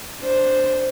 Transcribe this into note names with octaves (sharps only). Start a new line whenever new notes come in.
D4 C5